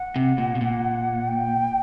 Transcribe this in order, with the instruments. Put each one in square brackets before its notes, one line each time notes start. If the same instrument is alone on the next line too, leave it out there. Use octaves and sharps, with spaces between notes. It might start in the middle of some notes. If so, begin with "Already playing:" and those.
Already playing: [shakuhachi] F#5
[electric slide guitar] C3
A#2
B2
A#2
[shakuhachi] G5